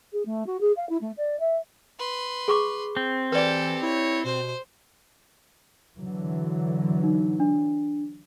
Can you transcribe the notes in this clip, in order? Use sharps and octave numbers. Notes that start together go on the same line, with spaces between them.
G#4
A3
F#4
G#4
F5
E4
A3
D5
E5
B4 C6
G#4 C#6 D6
C4
E3 G4 A4 B4 D5
E4 C#5
B2 C5
D3 E3 F#3
D#4
D4